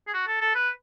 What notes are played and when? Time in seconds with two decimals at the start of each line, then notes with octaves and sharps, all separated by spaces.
0.07 G#4
0.14 F#4
0.27 A4
0.41 A4
0.55 B4